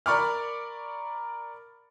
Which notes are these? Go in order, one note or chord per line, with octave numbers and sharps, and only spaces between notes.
A#4 D5 B5 C#6 D6 F6